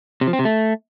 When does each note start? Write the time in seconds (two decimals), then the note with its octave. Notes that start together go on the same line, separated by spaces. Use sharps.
0.21 C3
0.27 F3
0.33 C4
0.39 C3
0.45 A3